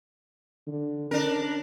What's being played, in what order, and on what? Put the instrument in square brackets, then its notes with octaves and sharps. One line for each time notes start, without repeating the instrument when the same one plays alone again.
[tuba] D3
[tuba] C#4 [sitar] D4 A#4